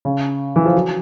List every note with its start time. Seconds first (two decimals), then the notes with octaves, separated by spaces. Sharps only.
0.05 C#3
0.56 E3
0.65 F3
0.75 F#3